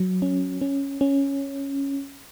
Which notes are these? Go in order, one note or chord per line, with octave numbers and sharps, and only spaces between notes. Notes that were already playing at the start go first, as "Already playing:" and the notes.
Already playing: F#3
C#4
C#4
C#4